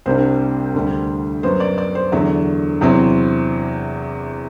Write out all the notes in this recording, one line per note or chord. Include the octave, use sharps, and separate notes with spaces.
C2 C3 G3 D4 C5
D2 D3 G3
F#2 F#3 B3 C5
D5
D5
C5
E2 D3 F#3 E5
E2 C3 F#3 C4 E4